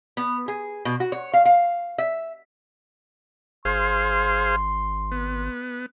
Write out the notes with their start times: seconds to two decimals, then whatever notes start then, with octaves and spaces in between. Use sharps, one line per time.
0.17 B3
0.48 G#4
0.85 B2
1.00 F#4
1.12 C#5
1.34 F5
1.45 F5
1.98 E5
3.65 G#1 G#4 C5 F5 C6
5.11 B3